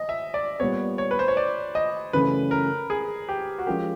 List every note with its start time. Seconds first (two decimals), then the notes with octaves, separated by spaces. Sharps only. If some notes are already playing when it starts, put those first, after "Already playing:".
Already playing: D#5
0.09 E5
0.34 D5
0.60 A#2 G3 B3 C#5
0.98 C#5
1.11 B4
1.19 C5
1.28 C#5
1.37 D5
1.75 D#5
2.13 F#2 C#3 E3 A3 C#4 B4
2.51 A#4
2.90 G#4
3.29 G4
3.59 F#4
3.67 F3 G#3 C#4 F4 G4 A#4